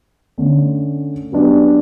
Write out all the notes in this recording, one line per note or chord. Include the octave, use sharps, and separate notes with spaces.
D3 A3 C#4
F#3 B3 D4 G4